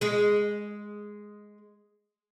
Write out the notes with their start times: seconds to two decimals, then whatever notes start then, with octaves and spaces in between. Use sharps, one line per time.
0.01 G#3 G#4